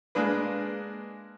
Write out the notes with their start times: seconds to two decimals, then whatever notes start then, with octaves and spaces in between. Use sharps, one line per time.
0.15 G#3 A#3 D4 B4